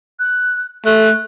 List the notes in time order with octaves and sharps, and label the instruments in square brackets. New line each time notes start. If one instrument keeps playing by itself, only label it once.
[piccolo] F#6
[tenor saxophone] A3 [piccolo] F#6